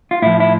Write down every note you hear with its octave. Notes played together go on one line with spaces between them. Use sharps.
F4
A2 F3 E4
E4